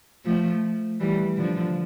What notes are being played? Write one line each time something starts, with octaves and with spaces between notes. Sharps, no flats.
F3 A3
E3 G3
D3 F3